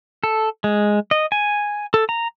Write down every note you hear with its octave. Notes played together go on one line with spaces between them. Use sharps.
A4
G#3
D#5
G#5
A4
A#5